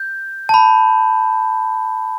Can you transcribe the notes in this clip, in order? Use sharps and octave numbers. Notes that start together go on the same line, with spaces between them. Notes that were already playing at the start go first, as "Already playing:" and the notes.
Already playing: G6
A5
B5